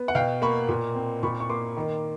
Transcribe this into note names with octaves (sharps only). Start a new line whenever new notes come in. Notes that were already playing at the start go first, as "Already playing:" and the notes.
Already playing: B3
F#5
B2 F5 G5
A#3 B5 C#6
A#2
C4
A#2 B5 C#6
C#6
A#3 C6 D6
D#3